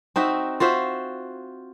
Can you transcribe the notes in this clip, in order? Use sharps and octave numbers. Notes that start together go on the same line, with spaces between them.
C4 D#4 F#4 E5
F4 F#4 C5 E5